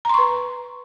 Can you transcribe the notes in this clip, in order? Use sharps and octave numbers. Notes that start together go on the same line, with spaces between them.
B4 A#5 C6 C#6